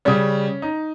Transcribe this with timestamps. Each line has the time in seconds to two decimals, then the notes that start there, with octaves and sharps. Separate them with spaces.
0.05 C#3 G3 C#4
0.62 D#4